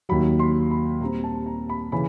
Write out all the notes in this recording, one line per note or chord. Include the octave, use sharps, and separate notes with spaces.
D#2 D#3 F#3 B5
C6
B5
A#2 G3 C4 A#5
A5
A#5
B5
C#3 E3 B5